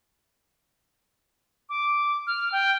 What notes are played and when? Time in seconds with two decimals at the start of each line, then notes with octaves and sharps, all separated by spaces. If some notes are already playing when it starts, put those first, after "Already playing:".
1.69 D6
2.27 F6
2.52 G5